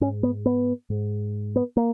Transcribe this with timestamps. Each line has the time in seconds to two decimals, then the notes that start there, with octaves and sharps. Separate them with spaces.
0.01 G#2 C#4
0.23 B3
0.46 B3
0.90 G#2
1.56 B3
1.77 A#3